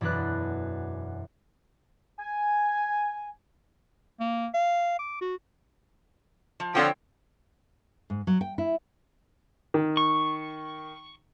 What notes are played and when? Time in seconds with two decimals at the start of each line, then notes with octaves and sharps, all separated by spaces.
0.01 E1 F#2 D4 B4 F#6
2.19 G#5
4.20 A#3
4.54 F5
4.99 D6
5.21 F#4
6.60 F3
6.75 D3 F3 C4 C#5 G5
8.10 G#2
8.27 F#3
8.41 G5
8.58 E4
9.74 D#3
9.97 C#6